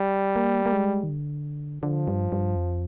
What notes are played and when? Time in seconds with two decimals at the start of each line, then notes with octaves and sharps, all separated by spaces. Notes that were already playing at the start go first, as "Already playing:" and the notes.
Already playing: G3
0.36 A#3
0.66 A#3
0.73 G#3
1.04 D#3
1.09 D3
1.83 D3 F3
2.08 G2
2.32 G2
2.56 F2